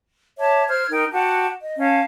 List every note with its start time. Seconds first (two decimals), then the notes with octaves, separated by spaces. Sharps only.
0.38 C#5 E5 A5 D6
0.68 C5 F6 G#6
0.90 D#4 A#4 G5
1.11 F#4 G4 F#5 A5
1.61 D#5
1.78 C#4 F5 A5